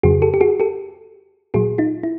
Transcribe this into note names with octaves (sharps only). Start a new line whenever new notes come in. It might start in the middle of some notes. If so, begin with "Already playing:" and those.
F2 C#3 F#3 F#4 G#4
G4 A4
G4
F#4 G#4
G4 A4
A#2 F#3 F#4 G#4
D#4 F4
E4